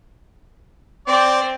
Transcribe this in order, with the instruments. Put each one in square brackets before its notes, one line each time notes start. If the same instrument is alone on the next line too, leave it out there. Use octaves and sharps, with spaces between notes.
[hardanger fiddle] C4 C5 [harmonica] D5